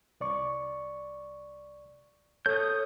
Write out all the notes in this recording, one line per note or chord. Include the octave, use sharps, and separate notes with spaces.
C2 D5 C#6
A4 C#5 D#6 G6